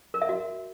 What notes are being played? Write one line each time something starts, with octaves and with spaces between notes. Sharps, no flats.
A#4
E5
F#4